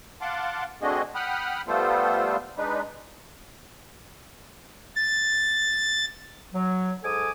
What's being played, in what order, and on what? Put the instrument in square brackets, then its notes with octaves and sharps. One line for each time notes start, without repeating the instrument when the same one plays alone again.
[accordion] F5 F#5 A5 C6 D6
A3 C4 D4 F#4 G#4 D#5
F#5 G5 B5 D#6 F6 F#6
G3 A3 B3 F4 A4 C5
G#3 D4 D#4 B4
[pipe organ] A6
[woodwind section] F#3
G#2 A4 G#5 D6 D#6